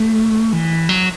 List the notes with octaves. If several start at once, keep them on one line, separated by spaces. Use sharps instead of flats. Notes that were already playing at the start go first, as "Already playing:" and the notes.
Already playing: A3
E3
F#3